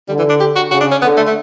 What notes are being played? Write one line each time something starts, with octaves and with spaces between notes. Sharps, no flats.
D3 G3
E3
D4
G4
F#4
C#3 F#4
D4
C#4
D3 B3
A3
A3